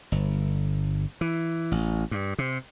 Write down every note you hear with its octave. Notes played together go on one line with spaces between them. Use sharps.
G1
E3
A1
G2
C3